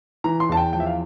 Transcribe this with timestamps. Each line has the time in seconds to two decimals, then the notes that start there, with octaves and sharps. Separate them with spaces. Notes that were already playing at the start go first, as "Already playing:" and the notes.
0.24 E3 A#5
0.40 C6
0.49 E2 A5
0.57 G5
0.73 F3 G5
0.80 E5
0.86 F5